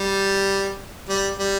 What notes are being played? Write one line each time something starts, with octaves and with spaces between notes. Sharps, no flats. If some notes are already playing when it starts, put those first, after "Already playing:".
Already playing: G3
G3
G3